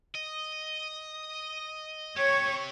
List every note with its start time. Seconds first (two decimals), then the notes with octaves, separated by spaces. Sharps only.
0.15 D#5
2.17 C4 G4 C#5 G#6